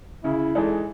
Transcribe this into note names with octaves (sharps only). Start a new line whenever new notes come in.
C#3 E4
E3 G#3 D#4 A4